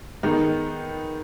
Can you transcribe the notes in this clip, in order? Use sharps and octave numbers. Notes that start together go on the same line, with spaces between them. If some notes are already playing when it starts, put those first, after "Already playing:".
D#3 G#3 B3 D#4